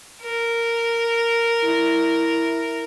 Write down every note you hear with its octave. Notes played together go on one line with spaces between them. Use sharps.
A#4
E4